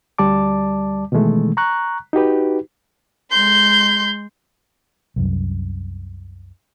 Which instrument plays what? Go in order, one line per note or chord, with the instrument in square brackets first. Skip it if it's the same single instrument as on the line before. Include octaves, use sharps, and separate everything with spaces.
[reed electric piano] D2 G3 D5 A5 D6
B2 D#3 E3 G#3 A3
A#5 C#6 F#6
D#4 F#4 G4 B4
[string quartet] G#3 C6 G6
[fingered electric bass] C2 F#2